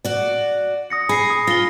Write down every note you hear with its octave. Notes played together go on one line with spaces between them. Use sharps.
F#4 D5
D#6 A#6 C#7
G#4 B5 C7
D#6
F4 A#6 G7